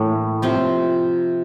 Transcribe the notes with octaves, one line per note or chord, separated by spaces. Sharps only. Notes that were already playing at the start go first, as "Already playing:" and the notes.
Already playing: A2 E3 A#3 D4
C3 F3 C4 F4